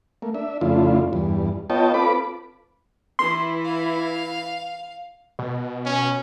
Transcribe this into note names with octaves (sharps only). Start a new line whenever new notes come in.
A3 A#3
D4 E5
F2 C#3 A3 D4 E4 F4
E2 G2
B3 F4 C#5 D#5 G5 A5
C4 F4 A4 B4 B5 D6
E3 E4 C6
F5
B2
C#4